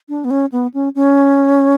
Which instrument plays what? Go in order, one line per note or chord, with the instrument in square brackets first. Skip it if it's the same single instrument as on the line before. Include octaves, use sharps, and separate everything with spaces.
[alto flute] D4
B3
C#4
B3
C#4
C#4